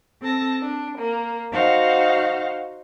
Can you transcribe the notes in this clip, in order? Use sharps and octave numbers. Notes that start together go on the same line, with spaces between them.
C4 A4 A5 A#6
D4
A#3
D#4 F#4 C5 F5 F#5